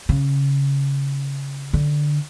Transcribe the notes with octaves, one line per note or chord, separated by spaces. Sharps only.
C#3
D3